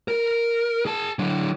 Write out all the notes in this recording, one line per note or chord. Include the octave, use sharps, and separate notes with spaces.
A#4
G#4 A5
D3 F#3